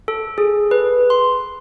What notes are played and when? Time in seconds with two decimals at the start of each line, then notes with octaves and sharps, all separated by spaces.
0.08 A4
0.38 G#4
0.71 B4
1.10 C6